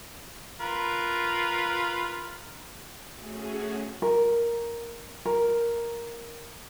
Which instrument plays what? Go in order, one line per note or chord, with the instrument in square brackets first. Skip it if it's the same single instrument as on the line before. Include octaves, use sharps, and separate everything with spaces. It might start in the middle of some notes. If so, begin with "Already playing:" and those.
[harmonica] F4 A#4 B4
[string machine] A3 C#4 F#4 G#4
[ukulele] A#4
A#4